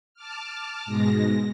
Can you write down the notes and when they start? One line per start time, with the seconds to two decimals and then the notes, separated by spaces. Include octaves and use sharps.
0.14 A5 D6 F6
0.85 G#2 B2 G#3 A#6